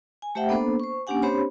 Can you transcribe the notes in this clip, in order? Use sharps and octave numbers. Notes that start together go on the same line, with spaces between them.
G#5
A3 G4 C5 E5 F#5 G5
A#3 B3 D4 A4 C5
C5 C#6
A#3 C#4 D4 G4 F#5 G#5
C4 D4 G4 C5 C#5 B5